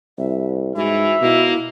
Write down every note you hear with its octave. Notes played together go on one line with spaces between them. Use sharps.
C2 E5
G#2 E3 F#4 E5
B2 A#3 E4